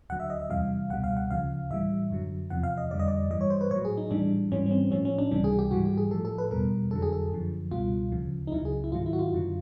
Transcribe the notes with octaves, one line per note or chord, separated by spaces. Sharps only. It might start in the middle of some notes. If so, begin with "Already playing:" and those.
D2 D3 F#3 F#5
E5
D#5
E5
E2 C3 E3 G3 F5
C#2 B2 G3 F#5
F5
F#5
D2 C#3 F3 F5
A2 E3 G3 E5
F#2 D3 F#3
E2 C3 F3 F#5
F5
D#5
F2 D3 G3 D5
D#5
D5
G2 E3 G3 D#5
C#5
C5
B4
A2 F#3 C#5
G#4
D#4
A2 E3 G3 D4
G#2 E3 G3 C#4
C#4
C4
A2 F3 C#4
C#4
D4
C#2 C3 E3 G3 D4
G#4
G4
G#2 E3 G3 F#4
G4
G#4
A2 F3 A4
A4
B4
E2 B2 G3 A#4
F2 D3 F#3 A4
G#4
A4
F#2 D3 F3
C#2 B2 G3 F4
D2 C#3 F3
D#4
C#2 C#3 F#3 E4
G#4
E4
G#2 D#3 F#3 F4
E4
F#4
F4
F#2 D3 F#3